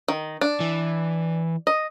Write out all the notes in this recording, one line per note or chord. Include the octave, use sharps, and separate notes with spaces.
D#3
D4
E3
D#5